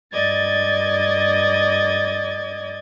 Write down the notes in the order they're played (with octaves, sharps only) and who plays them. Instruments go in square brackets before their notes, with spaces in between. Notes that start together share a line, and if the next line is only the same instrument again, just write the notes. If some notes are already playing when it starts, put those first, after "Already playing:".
[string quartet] G2 D5 D#5 G#6 A6